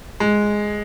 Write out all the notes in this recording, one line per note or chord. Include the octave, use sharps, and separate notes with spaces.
G#3